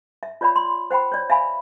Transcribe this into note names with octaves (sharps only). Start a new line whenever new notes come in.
E5
F4 C#5 D5 F#5 B5
C6
C5 F#5 G5 B5
C#5 D5
E5 F5 G#5 B5